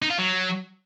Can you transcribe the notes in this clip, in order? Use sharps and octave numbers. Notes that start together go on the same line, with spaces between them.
D#4
F4
F#3